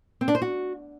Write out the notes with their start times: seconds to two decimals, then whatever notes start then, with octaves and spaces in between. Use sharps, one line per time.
0.21 C4
0.28 D4
0.35 C5
0.42 F#4